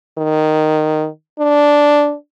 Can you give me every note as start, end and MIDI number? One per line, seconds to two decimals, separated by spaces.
0.18 1.08 51
1.39 2.15 62